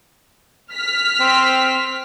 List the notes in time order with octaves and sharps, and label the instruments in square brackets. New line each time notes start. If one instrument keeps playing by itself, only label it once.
[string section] F6 B6
[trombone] C4